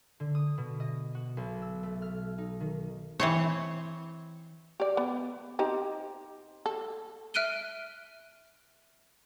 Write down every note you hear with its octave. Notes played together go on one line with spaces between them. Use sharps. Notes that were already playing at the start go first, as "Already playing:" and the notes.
D3
D#6
B2
D#5
F#4
B1
E6
A3
F6
D#4
D#3
E3 C4 C#5
G4 D5
B3
C4 D#4 G4
A4
E5 F6 F#6 D7 D#7 G7